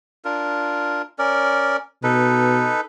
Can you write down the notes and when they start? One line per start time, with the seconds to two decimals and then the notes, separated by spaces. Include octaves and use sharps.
0.25 D4 F4 A#4
1.19 C#4 A#4 D5
2.03 B2 D#4 A4 B4